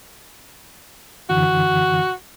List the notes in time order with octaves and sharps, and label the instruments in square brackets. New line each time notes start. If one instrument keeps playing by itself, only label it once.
[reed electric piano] F#2 D3 E3 [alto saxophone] F#4